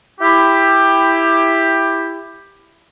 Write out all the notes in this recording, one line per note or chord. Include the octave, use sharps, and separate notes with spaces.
E4 G4